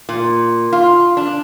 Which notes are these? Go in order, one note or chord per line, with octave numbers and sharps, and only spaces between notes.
A#2
F4
D4